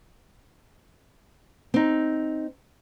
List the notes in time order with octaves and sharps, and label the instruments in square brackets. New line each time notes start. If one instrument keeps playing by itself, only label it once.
[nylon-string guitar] C4 D#4